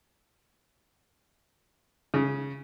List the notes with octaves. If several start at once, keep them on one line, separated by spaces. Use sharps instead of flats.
C#3